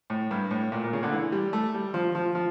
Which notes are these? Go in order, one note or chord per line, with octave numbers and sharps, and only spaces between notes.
A2
G2
A2
A#2
A#2
C#3
D3
E3
G3
A3
G3
F3
F3
F3